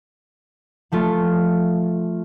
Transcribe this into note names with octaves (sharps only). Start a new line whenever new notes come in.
F3 A3 F4